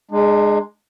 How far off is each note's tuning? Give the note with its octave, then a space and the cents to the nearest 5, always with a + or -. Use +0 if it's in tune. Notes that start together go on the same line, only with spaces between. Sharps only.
G#3 +0 D4 +45